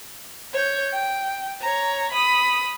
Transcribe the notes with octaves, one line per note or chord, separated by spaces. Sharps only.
C#5 G6
G5
C#5 A#5
B5 D#6